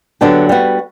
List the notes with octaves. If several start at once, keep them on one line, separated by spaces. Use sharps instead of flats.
D3 F#3 B3 D4 G4
G3 B3 F#4